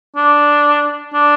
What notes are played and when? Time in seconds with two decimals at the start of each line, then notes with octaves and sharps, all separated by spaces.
0.16 D4
1.14 D4